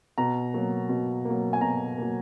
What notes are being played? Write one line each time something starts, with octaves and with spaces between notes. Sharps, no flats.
B2 A#5
F#3 A#3
B2
F#3 A#3
G#5
B2 A#5
F#3 A#3